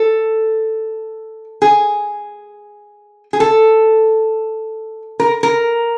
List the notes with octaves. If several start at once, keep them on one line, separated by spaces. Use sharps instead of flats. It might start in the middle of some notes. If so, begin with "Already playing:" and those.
Already playing: A4
G#4
G#4
A4
A#4
A#4